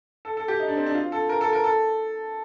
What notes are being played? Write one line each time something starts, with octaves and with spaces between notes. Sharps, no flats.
A4
A4
G4
D#4
D4
C4
D4
F4
A4
A#4
A4
A#4
A4